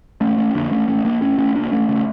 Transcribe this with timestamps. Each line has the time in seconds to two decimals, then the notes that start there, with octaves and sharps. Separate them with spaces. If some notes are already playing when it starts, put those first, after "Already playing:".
0.21 F1 A3 C#4
0.38 A3 C#4
0.55 F2 D3 A#3 D4
0.71 A3 C#4
0.88 A1 A3 C#4
1.05 A#3 D4
1.21 A2 A3 C#4
1.38 A3 C#4
1.55 C#2 A#3 D4
1.72 A3 C#4
1.89 C#3 A3 C#4